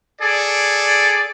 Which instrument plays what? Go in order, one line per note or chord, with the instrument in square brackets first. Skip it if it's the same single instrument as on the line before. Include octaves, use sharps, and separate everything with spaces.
[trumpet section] G#4 A4 D5